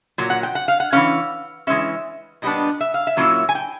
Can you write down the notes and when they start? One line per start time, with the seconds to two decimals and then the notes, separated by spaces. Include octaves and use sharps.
0.18 A#2 F#3
0.30 F#5
0.43 G5
0.55 F#5
0.68 F5
0.80 F#5
0.93 E3 A3 C#4 F5
1.67 E3 G#3 C#4 E5
2.42 A#2 G3 B3 D4 D#5
2.81 E5
2.94 F5
3.07 E5
3.17 A#2 F#3 A#3 C#4 E4
3.49 G#5
3.55 G5